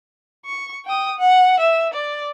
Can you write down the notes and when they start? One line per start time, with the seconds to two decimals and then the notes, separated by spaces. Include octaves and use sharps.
0.46 C#6
0.86 G5 D#6
1.19 F#5
1.60 E5
1.93 D5